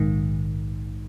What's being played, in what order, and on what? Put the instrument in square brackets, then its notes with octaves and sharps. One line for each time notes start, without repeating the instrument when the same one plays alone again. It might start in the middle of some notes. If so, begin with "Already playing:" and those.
Already playing: [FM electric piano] A#1 G#2 D#3